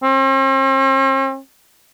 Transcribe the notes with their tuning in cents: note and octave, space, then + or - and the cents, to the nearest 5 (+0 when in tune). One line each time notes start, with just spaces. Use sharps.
C4 +45